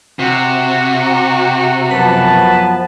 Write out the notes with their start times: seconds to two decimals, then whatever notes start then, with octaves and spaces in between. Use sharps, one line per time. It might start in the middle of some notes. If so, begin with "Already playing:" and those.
0.19 C3 F#4
1.91 F#2 F3 B3 B4 A5